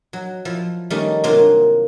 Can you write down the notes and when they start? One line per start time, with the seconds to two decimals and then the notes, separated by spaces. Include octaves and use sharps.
0.13 F#3
0.45 F3 E4
0.90 D#3 G3 A3 C#4 G4 A#4
1.24 G2 C3 F#3 A#3 C4 F4